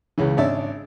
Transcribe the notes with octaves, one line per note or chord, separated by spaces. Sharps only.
C#2 C#3 E3
G#1 C#4 D4 D5 E5